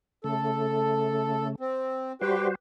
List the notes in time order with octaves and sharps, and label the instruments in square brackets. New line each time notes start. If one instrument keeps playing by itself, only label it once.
[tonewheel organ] C#3 A3 [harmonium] A4
[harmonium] C4
[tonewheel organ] G3 F#4 C5 [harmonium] G4 B4 G5